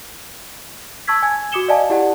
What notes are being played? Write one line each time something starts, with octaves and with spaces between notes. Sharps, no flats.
A5 C#6 E6 G#6 B6
G#5 G#6
F#4 D6 D#6 C#7 E7 G7
D5 D#5 F5 G#5 A5
E4 G4 D5 F#5 A5